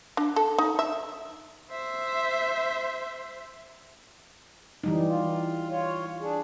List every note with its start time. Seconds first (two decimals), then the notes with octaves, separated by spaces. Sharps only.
0.17 D4
0.36 A4
0.58 D#4
0.79 E5
1.71 C5 E5
4.84 E3 G3 D#4
5.09 F4
5.71 F4 C#5
6.21 D4 G#4